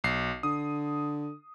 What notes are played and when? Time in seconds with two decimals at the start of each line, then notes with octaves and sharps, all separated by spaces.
0.04 B1 C7
0.43 D3 D#6